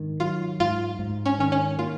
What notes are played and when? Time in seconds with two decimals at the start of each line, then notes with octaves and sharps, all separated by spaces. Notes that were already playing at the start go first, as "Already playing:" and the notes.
Already playing: G#2 D#3
0.20 F#3 F4
0.60 G#2 F4
0.99 G#2
1.26 C#4
1.39 D#3 C#4
1.52 C#4
1.78 A#3 F4